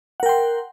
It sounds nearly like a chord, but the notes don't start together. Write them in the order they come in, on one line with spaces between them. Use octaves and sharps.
F#5 A#4 G5 C6